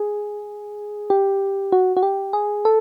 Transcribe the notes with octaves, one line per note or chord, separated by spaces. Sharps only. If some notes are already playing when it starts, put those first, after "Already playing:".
Already playing: G#4
G4
F#4
F#4
G4
G#4
A4